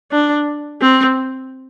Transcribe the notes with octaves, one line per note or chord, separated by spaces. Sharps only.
D4
C4